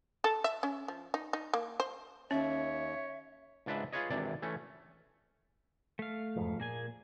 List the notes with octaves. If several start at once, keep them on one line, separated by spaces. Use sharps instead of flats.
A4
E5
C#4
F3
D#4
D#4
A#3
C5
D#2 C#4 C#5 E5
C#2 G#2 D4 B4 E5
F4 G#4 B4 C#5 D#5
G#1 C3 E3 D4 D5
E3 A3 C#4
A3 F5
E1 F2 G#2
A#2 A#3 G#4 G#5